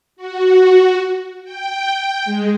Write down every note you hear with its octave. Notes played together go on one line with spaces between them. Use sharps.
F#4
G5
G#3